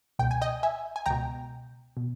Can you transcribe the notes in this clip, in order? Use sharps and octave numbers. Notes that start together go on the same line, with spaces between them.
C#2 B2 G5
G#5
D#5 G5
E5 G#5
G#5
C#2 B2 G5 A#5
B2